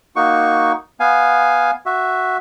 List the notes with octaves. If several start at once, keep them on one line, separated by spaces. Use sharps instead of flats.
A#3 D#4 F#4 C#6
B3 F5 G#5
F#4 E5